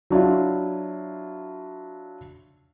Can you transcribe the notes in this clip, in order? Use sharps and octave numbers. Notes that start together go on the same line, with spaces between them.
F#3 D4 E4 F4